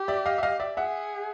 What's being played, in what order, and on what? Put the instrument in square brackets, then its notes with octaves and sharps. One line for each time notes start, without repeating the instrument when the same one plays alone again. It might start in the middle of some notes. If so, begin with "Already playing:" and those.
Already playing: [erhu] G4
[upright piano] D5 E5
D#5 F5
E5
D#5 F5
D5 E5
[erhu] G#4 [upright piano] E5 F#5